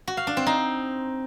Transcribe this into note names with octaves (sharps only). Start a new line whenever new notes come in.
F#4
F5
D4
C4
D#4